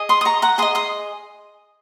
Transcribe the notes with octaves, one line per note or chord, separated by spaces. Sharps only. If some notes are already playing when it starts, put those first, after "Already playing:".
Already playing: G#4 D#5
C6 D#6
D#6
A#5 C#6
F#5 A#5
G#4 D#5 C6 D#6
C6 D#6